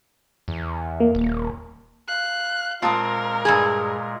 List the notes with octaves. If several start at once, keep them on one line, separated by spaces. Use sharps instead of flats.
E2
A#3
D#1
F5 F#6
A#2 G#3 C4 F4 A#4 A5 D#6
G2 C#3 G#4